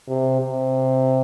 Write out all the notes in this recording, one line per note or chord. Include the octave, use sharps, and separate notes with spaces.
C3
C3